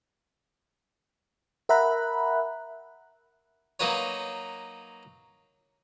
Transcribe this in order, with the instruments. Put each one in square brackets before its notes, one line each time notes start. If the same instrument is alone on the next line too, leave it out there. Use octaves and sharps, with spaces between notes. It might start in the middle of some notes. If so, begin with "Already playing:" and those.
[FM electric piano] A#4 E5 F#5 A#5 B5 F#6
[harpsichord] F#3 A#3 D#4 F#4 B4 C#5